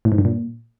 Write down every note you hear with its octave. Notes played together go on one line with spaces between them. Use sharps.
A2
G#2
G2
A#2